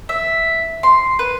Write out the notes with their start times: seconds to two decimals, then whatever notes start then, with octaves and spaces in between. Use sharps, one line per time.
0.09 E5
0.83 C6
1.19 B4